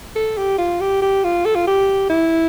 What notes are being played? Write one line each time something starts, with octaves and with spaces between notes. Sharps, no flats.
A4
G4
F4
G4
G4
F4
A4
F4
G4
E4